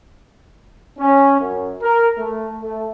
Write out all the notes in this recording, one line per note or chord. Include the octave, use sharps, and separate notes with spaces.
C#4
F#2
A#4
A3
A3